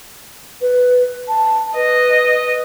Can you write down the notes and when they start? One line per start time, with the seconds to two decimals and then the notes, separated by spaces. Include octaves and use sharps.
0.61 B4
1.28 A5
1.75 B4 D#5